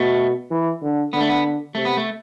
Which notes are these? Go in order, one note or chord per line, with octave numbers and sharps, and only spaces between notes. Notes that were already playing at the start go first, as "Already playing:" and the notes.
Already playing: B2 A3
E3
D3
D3 B3
A3
B3
C3 A3
B3
A3